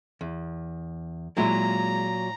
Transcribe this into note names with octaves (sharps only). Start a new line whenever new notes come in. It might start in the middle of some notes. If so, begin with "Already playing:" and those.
E2
A#2 F#3 G#3 E4 F4 E5 A#5